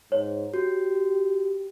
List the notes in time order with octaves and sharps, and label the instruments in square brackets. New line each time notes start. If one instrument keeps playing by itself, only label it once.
[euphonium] G#2 [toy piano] C#5
[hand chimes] F#4 [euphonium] G4